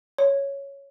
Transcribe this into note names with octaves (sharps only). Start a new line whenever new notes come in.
C#5